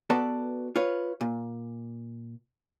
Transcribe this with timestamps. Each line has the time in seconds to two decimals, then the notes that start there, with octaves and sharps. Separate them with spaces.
0.10 B3 F#4 A4 B4 D5 A5
0.76 F4 B4 C#5
1.21 A#2